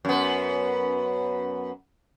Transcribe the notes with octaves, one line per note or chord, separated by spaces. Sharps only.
F#2 B3